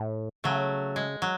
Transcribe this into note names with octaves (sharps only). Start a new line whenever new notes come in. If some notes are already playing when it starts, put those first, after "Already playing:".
Already playing: A2
C#3 F#3 A3
G#3
F#3